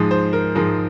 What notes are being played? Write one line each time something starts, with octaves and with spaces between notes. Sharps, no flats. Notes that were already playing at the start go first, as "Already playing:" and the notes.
Already playing: G#2 F3 G#3
C5
A#4
G#2 F3 G#3 A#4